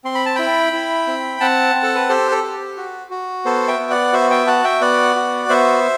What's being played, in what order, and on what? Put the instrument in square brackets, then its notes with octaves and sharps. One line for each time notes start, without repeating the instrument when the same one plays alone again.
[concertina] C4 C6
B5
A5
E4 G5 B5
E4
C4
C4 F#5 A5
C4
A4
B4
G4 A4 C5
A4
G4
F#4
F#4
B3 A4 C5
E5 G5
B3
D5 F#5
F#4 C5 E5
E5 G5
F#4 F#5 A5
E5 G5
B3 D5 F#5
F#4
B3 C5 E5